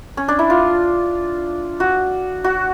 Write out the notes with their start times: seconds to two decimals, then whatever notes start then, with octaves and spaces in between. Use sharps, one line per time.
0.17 C#4
0.28 D4
0.39 E4
0.50 F4
1.80 F#4
2.44 F#4